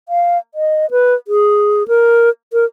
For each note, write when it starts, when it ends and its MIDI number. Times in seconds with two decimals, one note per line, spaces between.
0.09 0.38 77
0.55 0.89 75
0.91 1.14 71
1.28 1.87 68
1.88 2.30 70
2.53 2.65 70